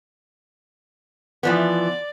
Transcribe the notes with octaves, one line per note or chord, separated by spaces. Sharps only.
E3 F3 B3 D5